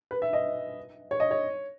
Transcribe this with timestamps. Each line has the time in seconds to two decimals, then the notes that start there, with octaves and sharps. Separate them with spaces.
0.11 B4
0.22 E5
0.33 D#5
1.11 C#5
1.20 D#5
1.31 C#5